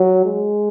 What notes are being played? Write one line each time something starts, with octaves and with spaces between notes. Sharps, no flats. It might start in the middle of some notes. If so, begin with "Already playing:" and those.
Already playing: F#3
G#3